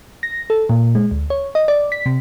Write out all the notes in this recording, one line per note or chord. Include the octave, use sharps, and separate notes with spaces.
A#6
A4
A#2
G#3
D2
C#5
D#5
D5
B6
C3